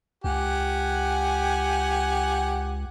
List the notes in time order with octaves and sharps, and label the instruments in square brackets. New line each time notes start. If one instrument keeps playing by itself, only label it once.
[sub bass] C#2 [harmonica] G4 F#5 G#5